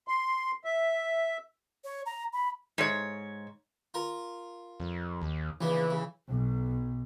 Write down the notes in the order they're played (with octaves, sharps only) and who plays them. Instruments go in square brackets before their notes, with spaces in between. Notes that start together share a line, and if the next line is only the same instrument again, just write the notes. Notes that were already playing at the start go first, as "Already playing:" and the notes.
[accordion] C6
E5
[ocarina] C#5
A#5
B5
[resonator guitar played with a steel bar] G#2 C#5
[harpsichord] F4 A#4
[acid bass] F2
D#2
[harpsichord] A#1 C#3 B3 [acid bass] E3
[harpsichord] C#3
[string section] B1